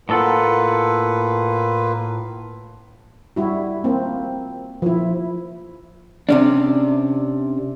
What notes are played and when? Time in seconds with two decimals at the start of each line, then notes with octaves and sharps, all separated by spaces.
0.09 A2 A#3 F4 A4 B4 F#5
3.36 G3 E4 F#4
3.84 A#3 C4
4.82 F3 E4
6.29 C3 C#4 D4